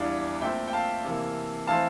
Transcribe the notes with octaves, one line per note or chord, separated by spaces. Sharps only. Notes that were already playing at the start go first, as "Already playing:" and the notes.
Already playing: E2 E3 G3 D4 D5 F5
A#2 A3 C4 E5 G5
G5
F5 A5
C3 E3 A#3
E3 A3 C4 F5 A5